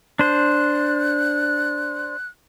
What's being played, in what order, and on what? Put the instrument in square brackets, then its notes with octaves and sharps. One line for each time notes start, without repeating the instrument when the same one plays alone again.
[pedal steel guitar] D4 C5 [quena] F#6